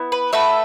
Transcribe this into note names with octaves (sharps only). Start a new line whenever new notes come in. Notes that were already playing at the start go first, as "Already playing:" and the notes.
Already playing: B3 E4
B4
A3 F#4 A4 B4 E5